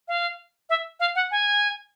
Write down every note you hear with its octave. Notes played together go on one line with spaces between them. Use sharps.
F5
E5
F5
F#5
G#5